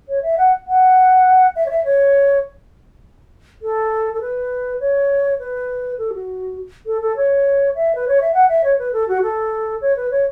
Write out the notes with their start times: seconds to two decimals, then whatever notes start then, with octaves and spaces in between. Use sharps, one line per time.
0.09 C#5
0.23 E5
0.38 F#5
0.67 F#5
1.56 E5
1.66 C#5
1.70 E5
1.85 C#5
3.62 A4
4.14 A4
4.21 B4
4.80 C#5
5.39 B4
5.98 A4
6.14 F#4
6.86 A4
7.02 A4
7.16 C#5
7.75 E5
7.95 B4
8.08 C#5
8.21 E5
8.34 F#5
8.49 E5
8.64 C#5
8.79 B4
8.93 A4
9.08 F#4
9.22 A4
9.81 C#5
9.96 B4
10.11 C#5